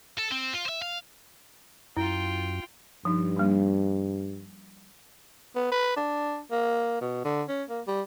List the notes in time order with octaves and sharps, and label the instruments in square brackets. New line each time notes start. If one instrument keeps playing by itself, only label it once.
[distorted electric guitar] A4
C4
F4
C5 E5
F5
[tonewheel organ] F#2 [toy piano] E4 [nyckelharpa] F4 G5
[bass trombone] G2 [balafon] F3 D#4
[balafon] G3 A#3 D4
[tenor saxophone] B3
B4
D4
A#3
B2
D3
C#4
A#3
G3